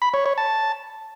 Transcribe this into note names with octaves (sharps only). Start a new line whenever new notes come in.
B5
C#5
C#5
A5